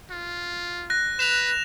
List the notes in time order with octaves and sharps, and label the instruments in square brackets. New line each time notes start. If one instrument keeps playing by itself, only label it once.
[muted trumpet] F4
[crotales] F#6 A#6
[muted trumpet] B4 [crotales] E7 F7